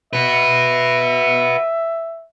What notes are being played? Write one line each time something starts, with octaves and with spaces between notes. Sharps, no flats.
F#4 B4 E5